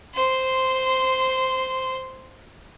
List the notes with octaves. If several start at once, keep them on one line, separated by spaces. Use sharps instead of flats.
C5 C6